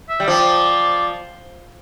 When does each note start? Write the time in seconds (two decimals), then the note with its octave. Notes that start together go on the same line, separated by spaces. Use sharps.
0.09 E5
0.20 G3
0.28 F3 D5